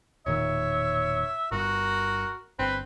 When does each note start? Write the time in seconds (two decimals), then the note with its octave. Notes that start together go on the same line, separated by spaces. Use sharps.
0.26 E1 A#2 D#3 C#5 E5
1.51 G1 G2 F#4 A#4
2.59 G1 C4 B4